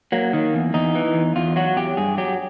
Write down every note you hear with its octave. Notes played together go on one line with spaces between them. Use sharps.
F#3 A#3
D#3
E2
E2 D#4
E3
E2
E2 F4
F#3 F#4
E2 G4
G2 G#4
F#3 G4